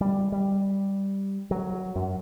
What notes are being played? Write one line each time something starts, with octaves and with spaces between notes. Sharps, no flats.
G3
G3
F#3
F#2